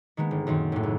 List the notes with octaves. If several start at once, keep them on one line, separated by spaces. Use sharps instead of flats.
D#3 G#3 A#3 B3
G1
F#2 A#2 D#3 C4
D#2 A2
C#2